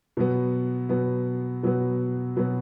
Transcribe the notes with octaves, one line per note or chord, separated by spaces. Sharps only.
B2 F#3 B3
B2 F#3 B3
B2 F#3 B3
B2 F#3 B3